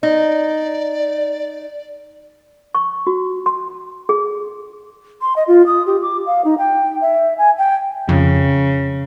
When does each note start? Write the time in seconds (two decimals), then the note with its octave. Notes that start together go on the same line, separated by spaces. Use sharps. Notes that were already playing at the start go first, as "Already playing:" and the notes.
0.03 D#4 D5
2.75 C#6
3.07 F#4
3.46 C6
4.09 G#4
5.22 C6
5.36 D#5
5.48 F4
5.66 D#6
5.87 G4
6.02 D6
6.26 F5
6.45 D#4
6.58 G5
7.01 E5
7.38 G#5
7.58 G5
8.09 F2 C#3